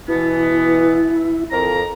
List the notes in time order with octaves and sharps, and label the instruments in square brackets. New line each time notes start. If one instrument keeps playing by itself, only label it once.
[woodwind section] B2 E3 B3 [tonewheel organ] E4
[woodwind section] F2 A#4 A#5